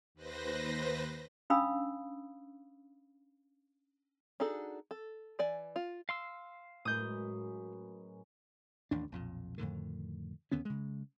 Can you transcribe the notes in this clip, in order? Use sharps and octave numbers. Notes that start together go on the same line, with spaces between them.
D#2 B4 C5 A#6
C#4 D4 F5 B5 D#6 E6
D4 D#4 F#4 G#4 A4
A4
E3 D5 G#5
F4
F5 C6 E6
F#2 A2 G#3 B4 D#6 G6
A1 D#2 D4
B1 F2 A#2
F2 A2 D3 D#3
D#2 D3 B3 C#4
C#3 G#3